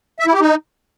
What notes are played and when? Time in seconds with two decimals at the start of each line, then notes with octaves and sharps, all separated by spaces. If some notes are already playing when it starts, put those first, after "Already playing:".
0.20 E5
0.27 E4
0.34 G4
0.41 D#4